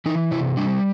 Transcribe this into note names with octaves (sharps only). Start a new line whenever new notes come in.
E3 D#4
C3 E4
G3 D4